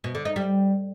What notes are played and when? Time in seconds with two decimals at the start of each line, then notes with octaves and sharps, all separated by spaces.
0.04 B2
0.15 D3
0.25 D#4
0.36 G3